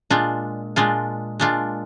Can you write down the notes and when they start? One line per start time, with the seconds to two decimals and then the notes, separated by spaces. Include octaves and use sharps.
0.10 A#2 G#3 D4 F4
0.76 A#2 G#3 D4 F4
1.40 A#2 G#3 D4 F4